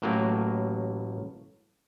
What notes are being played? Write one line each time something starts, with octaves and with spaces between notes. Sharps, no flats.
A1 A2 F#3 A#3 A#4